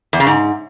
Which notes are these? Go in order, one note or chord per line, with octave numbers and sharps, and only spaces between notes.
E2
C#3
G#2